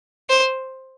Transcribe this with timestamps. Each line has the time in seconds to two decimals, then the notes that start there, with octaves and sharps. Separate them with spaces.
0.29 C5